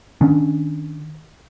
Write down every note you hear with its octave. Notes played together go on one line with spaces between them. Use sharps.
D#3 C#4 D4